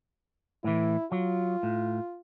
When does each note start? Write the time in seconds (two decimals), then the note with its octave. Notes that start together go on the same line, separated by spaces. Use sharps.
0.64 A2 E3 E4
1.12 F#3 F4
1.63 A2